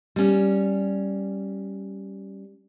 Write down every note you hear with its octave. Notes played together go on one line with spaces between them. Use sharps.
G3 C#4